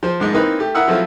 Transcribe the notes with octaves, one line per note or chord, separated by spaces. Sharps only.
F3 C5
A#1 G#2 G#3
E3 A#3 C4 D#4 B4
A3 G4
E4 A#4 F#5 D#6 E6
F3 F#3 A3 C4 E4 F4